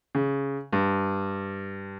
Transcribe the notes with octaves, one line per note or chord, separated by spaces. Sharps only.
C#3
G2